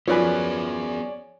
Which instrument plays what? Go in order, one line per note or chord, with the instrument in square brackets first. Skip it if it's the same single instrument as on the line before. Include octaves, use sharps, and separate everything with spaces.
[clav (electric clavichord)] F#2 B4 [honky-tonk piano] F3 [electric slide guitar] B3 G#4 [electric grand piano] C#5 D5 G#5